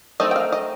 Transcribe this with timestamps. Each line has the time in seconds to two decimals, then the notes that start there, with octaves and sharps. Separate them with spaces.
0.20 A3 C4 D#4 D#5
0.31 G5
0.36 F5
0.52 D#5